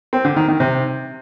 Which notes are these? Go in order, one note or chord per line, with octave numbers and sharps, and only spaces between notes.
C4
D3
D#3
D#3
C3